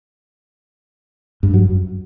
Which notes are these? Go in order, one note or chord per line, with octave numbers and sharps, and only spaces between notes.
G2
F#3
F#2